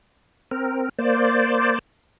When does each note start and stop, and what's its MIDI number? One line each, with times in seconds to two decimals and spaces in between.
0.51 0.89 60
0.51 0.89 70
0.99 1.79 58
0.99 1.79 72
0.99 1.79 74